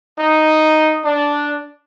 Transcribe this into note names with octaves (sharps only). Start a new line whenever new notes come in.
D#4
D4